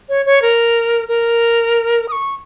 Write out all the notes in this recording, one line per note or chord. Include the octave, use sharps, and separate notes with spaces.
C#5
C#5
A#4
A#4
D#6
C#6